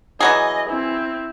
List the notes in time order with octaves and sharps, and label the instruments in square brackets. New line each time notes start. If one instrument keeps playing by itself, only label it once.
[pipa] E3 F#3 G#4 [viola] D#5
[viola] C4 E4